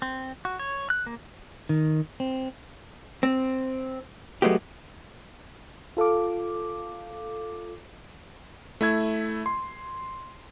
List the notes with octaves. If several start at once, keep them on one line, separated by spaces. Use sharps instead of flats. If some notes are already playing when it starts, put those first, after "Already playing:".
C4
F#4
C#5
F#6
A#3
D#3
C4
C4
F#3 G#3 A3 B3 G4
F4 A4 F5 D6
A3 E4 E5 G#6
C6